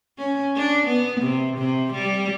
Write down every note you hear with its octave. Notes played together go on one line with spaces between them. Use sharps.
C#4
D4
B3
C3
C3
G3